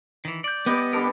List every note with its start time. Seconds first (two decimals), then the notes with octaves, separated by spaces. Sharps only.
0.25 D#3 E3
0.44 D5 G6
0.66 G3 B3 G4 D#5
0.93 D3 G3 A4 A#4